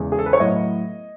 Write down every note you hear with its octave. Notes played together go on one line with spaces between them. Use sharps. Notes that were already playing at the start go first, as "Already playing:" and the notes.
Already playing: E2 C#3 G#3
G#4
A4
B4
C#5
A2 F#3 B3 D#5